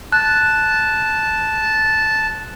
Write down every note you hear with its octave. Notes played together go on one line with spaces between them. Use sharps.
A5 F#6